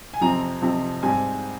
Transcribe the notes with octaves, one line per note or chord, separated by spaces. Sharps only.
G#5
F2 C3 F3 C4 A#5
F2 C3 F3 C4
G#2 G3 C4 G#5